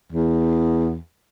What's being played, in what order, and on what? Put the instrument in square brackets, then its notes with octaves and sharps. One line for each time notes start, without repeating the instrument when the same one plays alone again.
[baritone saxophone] E2